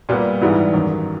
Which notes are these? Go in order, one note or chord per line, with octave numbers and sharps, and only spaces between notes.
A#2 G3 B3
G#2 E3 G3 B3 E4
F#2 D#3 F#3